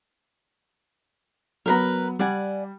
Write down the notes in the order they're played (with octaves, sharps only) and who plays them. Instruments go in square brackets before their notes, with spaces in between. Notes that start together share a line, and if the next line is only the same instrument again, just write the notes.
[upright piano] F#3 B3 [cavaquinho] A#4 B4 A#5
[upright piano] G3 [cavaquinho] D5 F#5 G#5